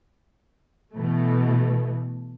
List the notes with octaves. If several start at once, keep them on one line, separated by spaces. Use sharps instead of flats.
B2 E3 A3